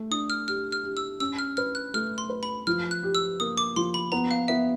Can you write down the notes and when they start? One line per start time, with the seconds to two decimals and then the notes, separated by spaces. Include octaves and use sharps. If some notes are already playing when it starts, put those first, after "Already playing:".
Already playing: A3
0.11 D4 D#6
0.30 F6
0.48 G4 F6
0.72 F6
0.84 G4
0.97 E6
1.20 C#4 E6
1.38 F6
1.57 B4 F6
1.75 F#6
1.94 A3 F6
2.18 C6
2.30 B4
2.43 B5
2.67 F3 F6
2.91 F#6
3.03 G4
3.15 E6
3.40 A#3 D#6
3.57 D6
3.76 F3 C6
3.94 B5
4.12 B3 A#5
4.31 F5
4.48 B3 E5